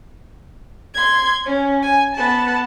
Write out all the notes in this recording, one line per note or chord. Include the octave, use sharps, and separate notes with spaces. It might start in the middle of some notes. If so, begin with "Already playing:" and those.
C6 G#6
C#4
G#5
B3 A5